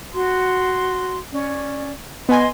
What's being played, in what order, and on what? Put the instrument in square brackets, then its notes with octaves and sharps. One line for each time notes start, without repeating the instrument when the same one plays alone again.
[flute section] F#4 C6
C#4 D5
[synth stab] B3 G#5 [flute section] D#5 C6